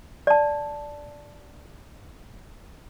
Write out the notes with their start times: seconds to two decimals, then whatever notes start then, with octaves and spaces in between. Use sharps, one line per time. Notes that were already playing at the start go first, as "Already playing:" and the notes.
0.27 D5 A5